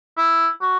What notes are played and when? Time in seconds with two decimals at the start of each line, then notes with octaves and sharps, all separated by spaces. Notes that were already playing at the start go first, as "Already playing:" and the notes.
0.17 E4
0.62 F#4